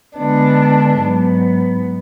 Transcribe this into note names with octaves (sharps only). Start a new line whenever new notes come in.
D3 G#3 B3 D4
G#2 F#3 B3